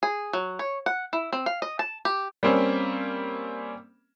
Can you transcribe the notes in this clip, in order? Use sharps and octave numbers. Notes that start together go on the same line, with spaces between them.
G#4
F#3
C#5
F#5
E4
C4
F5
D#5
A5
G4
G3 A#3 C4 C#4